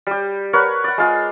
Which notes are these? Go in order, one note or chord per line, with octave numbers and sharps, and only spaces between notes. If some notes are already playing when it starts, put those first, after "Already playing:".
G3 G4
A#4 B4 C#5 F#5
D5 F#5
G#3 F4 G#4